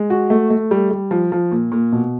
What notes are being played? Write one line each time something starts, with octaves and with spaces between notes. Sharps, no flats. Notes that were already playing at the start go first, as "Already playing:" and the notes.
Already playing: G#3
F#4
A3
A3
G3
G3
F3
F3
A#2
A#2
B2